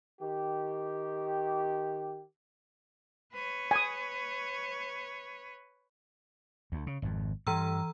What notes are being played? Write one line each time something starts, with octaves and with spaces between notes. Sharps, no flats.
D#3 G4
B4 C#5
G#5 D#6
D2
C#3
G#1 F2
G2 E3 A#5 E6